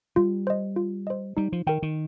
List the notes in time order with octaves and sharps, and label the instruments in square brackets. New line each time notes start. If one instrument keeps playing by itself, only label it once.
[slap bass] G3 [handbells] F4
[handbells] C5 D#5
F4
C5 D#5
[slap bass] G3 [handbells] D#4
[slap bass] F3
[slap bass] D#3 [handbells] A#4 G5
[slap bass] D#3